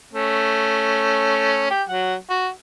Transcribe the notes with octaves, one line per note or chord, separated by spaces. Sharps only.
A3 C#4
G4
F#3 F#5
F#4